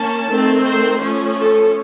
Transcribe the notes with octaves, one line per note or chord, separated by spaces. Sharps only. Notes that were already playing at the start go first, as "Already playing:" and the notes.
Already playing: A#3 C#4 A5
D#3 A3 C4
C5
F3 A3 C#4
A4